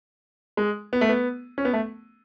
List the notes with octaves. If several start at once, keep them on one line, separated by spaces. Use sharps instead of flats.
G#3
B3
A3
B3
C#4
B3
A3